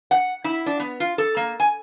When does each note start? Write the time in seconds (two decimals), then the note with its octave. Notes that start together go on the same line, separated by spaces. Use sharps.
0.11 F#5
0.44 E4
0.66 D4
0.80 B3
1.00 F4
1.18 A4
1.37 A#3
1.60 G#5